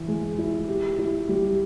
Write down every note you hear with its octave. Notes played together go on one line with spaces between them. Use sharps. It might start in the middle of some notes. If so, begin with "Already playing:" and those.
Already playing: E3
G#3
E4
G4
E4
G3